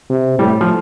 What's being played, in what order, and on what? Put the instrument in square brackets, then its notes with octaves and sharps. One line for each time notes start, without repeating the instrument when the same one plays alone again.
[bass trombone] C3
[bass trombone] A2 [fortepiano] G3
[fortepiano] F3